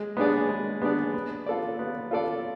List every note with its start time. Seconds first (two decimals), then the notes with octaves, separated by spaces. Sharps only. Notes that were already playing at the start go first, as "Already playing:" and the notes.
Already playing: G#3
0.17 B3 D4 G#4 D5
0.49 G#3
0.82 B3 D4 G#4 D5
1.14 B3
1.46 F4 A4 D5
1.79 B3
2.11 F4 A4 D5